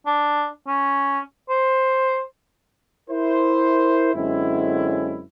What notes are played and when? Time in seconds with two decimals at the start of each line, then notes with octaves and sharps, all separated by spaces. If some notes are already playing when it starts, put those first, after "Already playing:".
0.06 D4
0.67 C#4
1.49 C5
3.10 E4 A#4 C5
4.14 F#2 D3 G#3 C4 C#4 E4